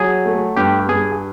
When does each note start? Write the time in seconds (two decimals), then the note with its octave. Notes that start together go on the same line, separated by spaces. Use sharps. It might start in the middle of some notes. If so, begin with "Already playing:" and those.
Already playing: F#3 G#4
0.25 A3
0.57 G2 G4
0.89 G2 G#4